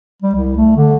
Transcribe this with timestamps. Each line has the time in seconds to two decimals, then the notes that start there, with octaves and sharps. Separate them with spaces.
0.22 G3
0.35 C2
0.57 A3
0.76 D3